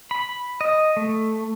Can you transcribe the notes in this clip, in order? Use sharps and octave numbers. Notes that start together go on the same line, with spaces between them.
B5
D#5
A3